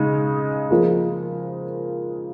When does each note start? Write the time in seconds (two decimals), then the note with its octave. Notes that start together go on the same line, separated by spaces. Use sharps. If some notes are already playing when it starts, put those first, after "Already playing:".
Already playing: C#3 G#3 D#4
0.70 F3 A#3 F4 G#4